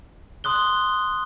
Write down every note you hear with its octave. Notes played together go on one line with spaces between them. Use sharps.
C6 D#6 F#6 G7